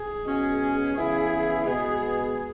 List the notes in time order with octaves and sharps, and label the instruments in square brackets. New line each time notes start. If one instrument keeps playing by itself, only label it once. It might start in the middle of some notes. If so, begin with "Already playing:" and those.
Already playing: [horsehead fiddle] G#4
[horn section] B2 G#3 C#4 F#4
[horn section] C#3 E3 B3 E4 [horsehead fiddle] G#4
[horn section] B2 G#3 B3 [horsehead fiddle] G#4